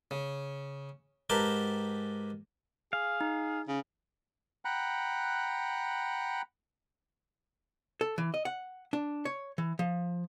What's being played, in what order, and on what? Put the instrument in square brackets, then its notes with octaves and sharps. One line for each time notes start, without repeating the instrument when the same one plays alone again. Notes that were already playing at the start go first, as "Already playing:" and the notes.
[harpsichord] C#3
G#2 G4 A#4 B4 G5 A5
[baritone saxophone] G#4 [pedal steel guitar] F5
[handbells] D#4
[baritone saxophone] C#3
[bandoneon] F#5 G5 A#5 B5 F#6
[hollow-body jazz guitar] A4
E3
D#5
F#5
D4
C#5
E3
F3